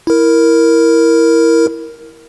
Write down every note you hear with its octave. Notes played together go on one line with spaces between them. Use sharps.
E4 A#4